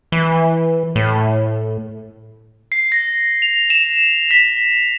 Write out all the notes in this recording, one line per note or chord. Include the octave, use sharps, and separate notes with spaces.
E3
A2
C7
A#6
F7
E7
B6